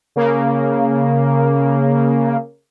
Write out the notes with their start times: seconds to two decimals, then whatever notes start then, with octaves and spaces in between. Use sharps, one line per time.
0.16 C#3 A#3